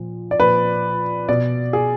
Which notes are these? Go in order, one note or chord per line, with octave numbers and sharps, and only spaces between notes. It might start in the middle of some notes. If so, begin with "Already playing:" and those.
Already playing: A#2 F3
D5
A#2 F3 B4
B2 D5
G#4